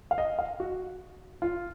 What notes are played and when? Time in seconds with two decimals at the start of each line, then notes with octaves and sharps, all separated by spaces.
0.11 F5
0.18 D#5
0.39 F5
0.60 F#4
1.42 F4